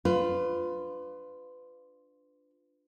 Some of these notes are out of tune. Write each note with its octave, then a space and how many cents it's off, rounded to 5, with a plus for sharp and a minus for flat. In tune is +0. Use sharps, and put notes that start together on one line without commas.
D4 +0 F4 +0 B4 +25